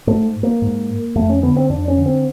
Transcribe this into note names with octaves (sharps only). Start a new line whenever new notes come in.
G#2 A3
A#3
G#2
F2 A3
C#4
D3 B3
C4
F2 D4
C#4
D3
C4